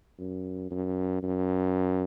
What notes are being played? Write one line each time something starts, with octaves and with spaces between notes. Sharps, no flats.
F#2
F#2
F#2